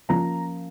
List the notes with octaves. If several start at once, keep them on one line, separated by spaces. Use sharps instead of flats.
F3 A#3 C#4 F4 A#5